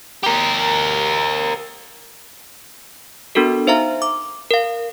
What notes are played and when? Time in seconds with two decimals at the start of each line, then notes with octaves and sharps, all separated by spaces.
0.24 G4 A#4
3.35 B3 D4 F#4 A4 A#4
3.67 D#4 C5 E5 F5 A#5
4.02 D6
4.51 A#4 F5